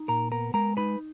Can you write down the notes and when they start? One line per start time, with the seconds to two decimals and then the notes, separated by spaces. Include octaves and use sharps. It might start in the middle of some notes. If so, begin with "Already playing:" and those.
Already playing: D#4
0.08 A#2 A#4 A#5
0.31 B3 A#4 A#5
0.54 G#3 A#4 A#5
0.77 D#4 B4 B5